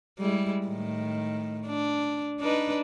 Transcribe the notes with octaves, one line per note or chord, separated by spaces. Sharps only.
G3 G#3 E4
A2 D#3
D4
D4 D#4 B4